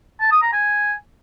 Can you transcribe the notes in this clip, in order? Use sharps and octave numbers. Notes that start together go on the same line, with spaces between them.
A5
D#6
A#5
G#5